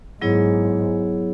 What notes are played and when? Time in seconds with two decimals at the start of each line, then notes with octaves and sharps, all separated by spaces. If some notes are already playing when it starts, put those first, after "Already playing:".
0.21 G#2 F#3 B3 E4 G#4 C#5